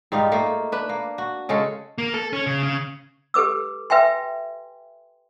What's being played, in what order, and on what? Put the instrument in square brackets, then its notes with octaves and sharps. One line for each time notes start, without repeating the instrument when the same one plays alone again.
[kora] G#2 G3 D#4 F4
A3 A#3
D4 B4
A#3
F#4
C#3 G#3 C#4 A4
[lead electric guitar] A#3
A4
C#4
C#3
C#3
[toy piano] G4 A4 B4 D6 E6
B4 E5 G5 G#5 C6